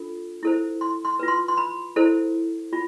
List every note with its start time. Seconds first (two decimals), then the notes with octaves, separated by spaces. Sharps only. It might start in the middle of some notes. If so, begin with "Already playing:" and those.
Already playing: D4 F4 A4
0.43 E4 A4 C5
0.81 C6
1.05 C6
1.19 F4 B4
1.28 C6
1.48 C6
1.57 B5
1.96 E4 A4 C5
2.73 F4